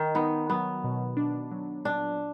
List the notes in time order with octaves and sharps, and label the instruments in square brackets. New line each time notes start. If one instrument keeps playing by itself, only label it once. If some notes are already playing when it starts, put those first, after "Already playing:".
Already playing: [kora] D#3
[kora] B3 [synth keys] D#4
[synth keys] F#3 [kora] B3
[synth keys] B2
D4
F#3
[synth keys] A#2 [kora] D4